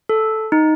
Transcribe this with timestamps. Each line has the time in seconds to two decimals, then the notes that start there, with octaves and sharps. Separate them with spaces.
0.09 A4
0.52 D#4